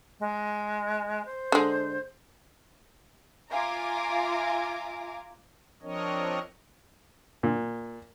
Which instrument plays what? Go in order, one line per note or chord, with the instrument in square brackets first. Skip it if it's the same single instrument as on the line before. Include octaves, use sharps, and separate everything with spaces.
[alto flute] G#3
C5
[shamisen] D3 G#3
[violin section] F4 E5 F5 G#5 A#5 D6
[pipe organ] F3 C4 D4 A#4 C#5 D#5
[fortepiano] A#2